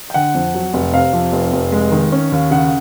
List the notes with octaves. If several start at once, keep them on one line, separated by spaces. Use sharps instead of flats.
G5
D3 F#5
F2
F#3
F1
C3 F5
F2
F1
F1
G#3
D#3
C#4
D#2
C#3 F#5